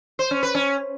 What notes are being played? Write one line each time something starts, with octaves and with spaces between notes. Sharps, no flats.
C5
C#4
B4
C#4